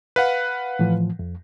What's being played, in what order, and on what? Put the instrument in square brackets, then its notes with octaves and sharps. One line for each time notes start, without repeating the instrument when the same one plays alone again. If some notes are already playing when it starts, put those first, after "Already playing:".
[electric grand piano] B4 F5 F#5
[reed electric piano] A2 E3 F3
F2